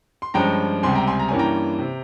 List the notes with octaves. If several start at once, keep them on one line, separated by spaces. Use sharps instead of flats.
C6
G2 F3 G#3 C#4 G5 A#5
C#2 C3 G3 C4 G#5 C6
G5 A#5
G#5 C6
A#5
G2 E3 A#3 C#4 G#5
G5 A#5
C3